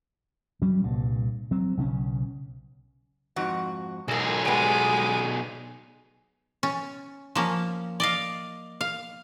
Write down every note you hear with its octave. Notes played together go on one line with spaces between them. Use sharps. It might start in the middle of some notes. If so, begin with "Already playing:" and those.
F#3 G3 C#4
C2 G2 A#2
F#3 C4
B1 C#3 C4 C#4
F2 G#2 F#4
B1 G#3 A#3 G#4
G3 G#3 B3
C#4
F3 A#3 C#4
D5 D#5 F5
F5